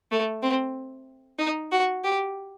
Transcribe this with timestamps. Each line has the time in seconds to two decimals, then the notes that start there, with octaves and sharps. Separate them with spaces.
0.11 A3
0.42 C4
1.39 D#4
1.72 F#4
2.04 G4